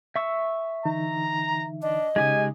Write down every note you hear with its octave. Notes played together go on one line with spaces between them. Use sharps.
E5 C#6 E6
D3 E3 D#4 A#5
D4 D#5
C#3 G#3 D#4 G4 G#5 D#6